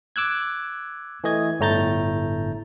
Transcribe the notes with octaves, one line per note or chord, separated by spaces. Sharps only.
D6 E6 F#6 G#6
E3 A3 D#5 G#6
G1 A2 A3 A#5 G6 A6